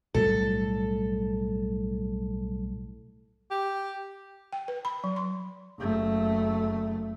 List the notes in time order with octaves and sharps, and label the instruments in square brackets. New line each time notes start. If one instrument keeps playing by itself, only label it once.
[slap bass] B1 A2 G3 [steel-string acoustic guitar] A4
[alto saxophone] G4
[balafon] G5
B4
B5
F#3
C6
[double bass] F#1 A3